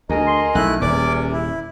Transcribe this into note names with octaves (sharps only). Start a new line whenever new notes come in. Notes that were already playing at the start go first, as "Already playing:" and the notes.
D2 G#4 A#4 D#5
C6
B1 A3 C#4 E4 F#6
D#1 E2 C3 D5 D6
E4